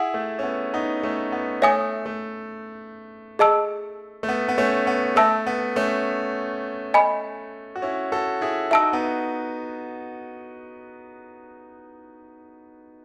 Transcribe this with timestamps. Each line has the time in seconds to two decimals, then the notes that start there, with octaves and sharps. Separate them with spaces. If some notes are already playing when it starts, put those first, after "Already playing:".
Already playing: E4 G#4 F#5
0.14 A3
0.39 C#4
0.43 B3
0.74 B3 D#4
1.03 A3 C#4
1.32 B3
1.62 A3 C#5 E5 G#5 D#6
2.06 A3
3.39 G#4 D#5 A5 E6
4.23 A3
4.29 B3
4.48 B3
4.58 A3 C#4
4.87 B3
5.16 A3 E5 A5 E6
5.46 B3
5.76 A3 C#4
6.94 D#5 G#5 B5
7.76 F#4
7.82 C#4 E4
8.12 F#4 A4
8.41 E4 G#4
8.71 D#4 F#4 E5 A5 E6
8.93 B3 D#4